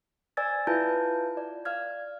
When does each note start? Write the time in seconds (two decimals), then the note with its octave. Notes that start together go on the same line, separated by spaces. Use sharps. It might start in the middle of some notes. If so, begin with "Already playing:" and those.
0.37 C5 D5 G#5 E6 G#6 A6
0.67 E4 F4 B4 A5 G6
1.37 D5
1.65 D5 F5 F6 G#6